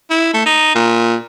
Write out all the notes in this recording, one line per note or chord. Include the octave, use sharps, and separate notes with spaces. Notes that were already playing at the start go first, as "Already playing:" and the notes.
E4
A3
D#4
A#2